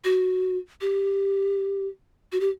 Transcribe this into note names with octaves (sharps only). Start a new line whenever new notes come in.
F#4
G4
F#4
G4